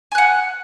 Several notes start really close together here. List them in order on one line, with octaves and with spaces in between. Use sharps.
G#5 F#6 F#5